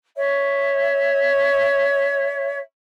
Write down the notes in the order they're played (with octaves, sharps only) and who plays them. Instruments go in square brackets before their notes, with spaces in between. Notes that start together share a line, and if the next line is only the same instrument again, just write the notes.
[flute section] C#5 E5